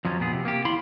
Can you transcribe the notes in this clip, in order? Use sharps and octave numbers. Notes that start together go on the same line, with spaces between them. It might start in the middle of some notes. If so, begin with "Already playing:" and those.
F2 F3 F#3 C#4
A#2 B3 G#4
C3
A#3 G4
E2 E4 F5 B5 C6